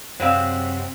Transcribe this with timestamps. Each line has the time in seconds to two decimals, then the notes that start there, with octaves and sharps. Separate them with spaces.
0.20 F#2 C3 F#3 G#3 C4 C5 D5 F5